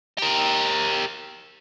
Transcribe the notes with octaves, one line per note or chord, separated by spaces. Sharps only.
G4 A#4